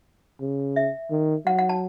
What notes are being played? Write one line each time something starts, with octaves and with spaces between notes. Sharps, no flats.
C#3
E5
D#3
F#3 F#5
F#5
A5